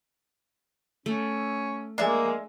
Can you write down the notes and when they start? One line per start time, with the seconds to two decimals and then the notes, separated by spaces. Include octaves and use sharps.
1.06 A3 C#4
1.98 G#3 A#3 D4 E5